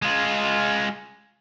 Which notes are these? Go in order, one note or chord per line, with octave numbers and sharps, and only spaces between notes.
G#3 F4